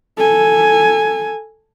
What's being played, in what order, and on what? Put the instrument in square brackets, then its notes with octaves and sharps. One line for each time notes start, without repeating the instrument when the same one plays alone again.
[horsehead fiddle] A4 G#5